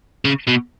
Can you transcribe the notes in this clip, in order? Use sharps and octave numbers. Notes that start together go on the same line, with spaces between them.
C#3
B2